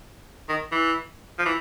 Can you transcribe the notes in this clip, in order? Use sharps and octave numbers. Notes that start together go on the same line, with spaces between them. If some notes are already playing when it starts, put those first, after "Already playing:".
D#3
E3
F3
E3